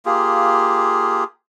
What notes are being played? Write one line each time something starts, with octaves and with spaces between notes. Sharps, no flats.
A#3 F4 G4 G#4